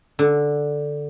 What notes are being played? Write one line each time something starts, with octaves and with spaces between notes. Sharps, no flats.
D3